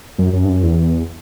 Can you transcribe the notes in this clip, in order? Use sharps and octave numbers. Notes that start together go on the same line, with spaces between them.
F#2
F#2
G2
F#2
E2